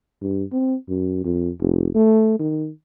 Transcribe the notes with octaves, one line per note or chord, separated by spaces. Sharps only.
G2
C4
F#2
F2
F1
A3
D#3